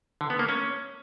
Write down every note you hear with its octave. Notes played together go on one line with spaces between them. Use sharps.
D3
B3
A#3
C#4